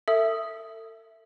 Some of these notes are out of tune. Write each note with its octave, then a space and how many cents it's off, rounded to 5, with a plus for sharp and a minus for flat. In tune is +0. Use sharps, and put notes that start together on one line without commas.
A4 +35 E5 +5 D#6 +0